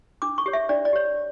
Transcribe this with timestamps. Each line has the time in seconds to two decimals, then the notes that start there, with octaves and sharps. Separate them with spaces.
0.22 D4 D6
0.38 C#6
0.46 G4 C#5
0.53 E5
0.69 D4 D5
0.85 D5
0.93 G4 C#5